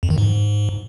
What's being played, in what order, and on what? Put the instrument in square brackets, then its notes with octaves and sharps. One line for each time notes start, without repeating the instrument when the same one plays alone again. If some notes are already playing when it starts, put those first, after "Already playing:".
[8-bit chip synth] F2
D#3
G#2